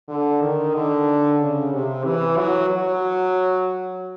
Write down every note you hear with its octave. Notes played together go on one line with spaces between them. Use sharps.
D3
D#3
D3
C#3
C3
E3
F#3
F#3